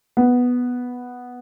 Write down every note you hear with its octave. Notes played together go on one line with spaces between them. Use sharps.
B3